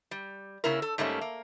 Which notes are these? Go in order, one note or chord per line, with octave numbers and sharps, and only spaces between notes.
G3
C#3 A#3 C#4 E4 A#4
A4
G#2 G3 A3 A#3 C#4
A#3